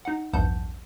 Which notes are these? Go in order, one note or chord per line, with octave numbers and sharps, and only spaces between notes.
D#4 F#5
A#1 E2 G2 F#5 A5 G6